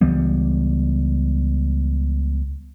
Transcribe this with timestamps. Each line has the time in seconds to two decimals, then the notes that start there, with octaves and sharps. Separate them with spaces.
0.01 C#2 E3 G3 B3